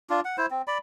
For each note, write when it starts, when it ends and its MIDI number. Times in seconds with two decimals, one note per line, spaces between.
0.10 0.20 62
0.10 0.20 65
0.25 0.36 78
0.38 0.46 64
0.38 0.46 72
0.51 0.62 60
0.67 0.78 74
0.67 0.78 83